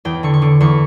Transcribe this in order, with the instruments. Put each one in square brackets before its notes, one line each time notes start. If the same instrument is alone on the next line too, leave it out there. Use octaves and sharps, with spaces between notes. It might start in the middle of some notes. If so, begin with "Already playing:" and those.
[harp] E2 G5
D3 C#6
C#6
D3 D6
E2 C#6